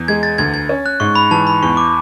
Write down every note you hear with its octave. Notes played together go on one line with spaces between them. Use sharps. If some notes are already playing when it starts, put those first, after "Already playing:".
Already playing: E2
G#3 G#6
A6
D2 G#6
G#6
C#4
F#6
G#2 C#6
B5
E3 A5
B5
E2 C#6
D6